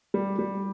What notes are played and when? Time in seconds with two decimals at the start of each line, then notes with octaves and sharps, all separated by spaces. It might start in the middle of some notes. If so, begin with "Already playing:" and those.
0.14 G3
0.39 G3